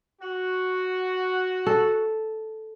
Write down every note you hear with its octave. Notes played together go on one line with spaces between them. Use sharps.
F#4
A4